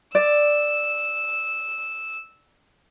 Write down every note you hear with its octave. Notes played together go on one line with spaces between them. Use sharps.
D5 E6